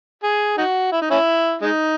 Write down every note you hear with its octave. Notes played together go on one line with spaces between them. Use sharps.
G#4
D#4 F#4
E4
D#4
C#4 E4
G#3 D#4